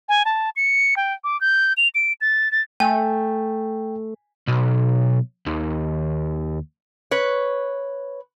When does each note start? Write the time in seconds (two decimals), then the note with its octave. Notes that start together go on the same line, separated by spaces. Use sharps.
0.09 G#5
0.25 A5
0.56 C#7
0.97 G5
1.24 D6
1.41 G6
1.77 F7
1.95 D7
2.21 A6
2.52 A6
2.80 A3 G5 G#5
4.48 B1
5.46 D#2
7.11 B4 C#5